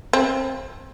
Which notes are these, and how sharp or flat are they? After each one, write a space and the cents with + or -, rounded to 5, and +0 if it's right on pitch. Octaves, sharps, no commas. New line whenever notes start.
C4 +25